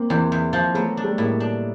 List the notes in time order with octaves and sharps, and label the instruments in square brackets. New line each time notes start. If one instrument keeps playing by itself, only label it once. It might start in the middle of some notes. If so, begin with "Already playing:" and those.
Already playing: [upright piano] A#3 C4
[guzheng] E2 [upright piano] A#3 C4
[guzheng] E2
F3
[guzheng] F#3 [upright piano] A3 B3
[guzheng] D4
[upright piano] G3 A3
[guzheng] A2 [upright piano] G#3 A#3
[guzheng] D4